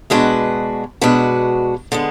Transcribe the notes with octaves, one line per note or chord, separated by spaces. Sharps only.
B2 G#3 D4 F#4 B4
B2 G#3 D4 F#4 B4
D3 G#3 B3